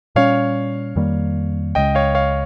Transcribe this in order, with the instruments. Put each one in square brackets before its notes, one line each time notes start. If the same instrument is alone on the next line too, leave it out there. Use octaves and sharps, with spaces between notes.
[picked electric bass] A#2 G3 C#4 [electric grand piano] C#5 F5
[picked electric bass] F2 D#3 G3 A#3
[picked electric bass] C#2 C#3 G#3 [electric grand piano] D#5 G5
[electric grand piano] C#5 F5
C#5 F5